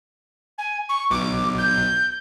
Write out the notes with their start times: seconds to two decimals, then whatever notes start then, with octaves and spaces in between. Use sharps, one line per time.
0.58 G#5
0.89 C#6
1.11 B1 D6
1.58 G6